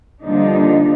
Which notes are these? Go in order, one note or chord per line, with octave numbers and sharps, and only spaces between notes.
D3 F3 G3 A#3 D4 D#4